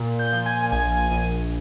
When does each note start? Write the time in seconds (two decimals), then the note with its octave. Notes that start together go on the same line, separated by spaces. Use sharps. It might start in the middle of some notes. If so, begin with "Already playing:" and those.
Already playing: A#2
0.19 G6
0.32 F3
0.46 G#5
0.72 A#1 G#5
1.11 A#1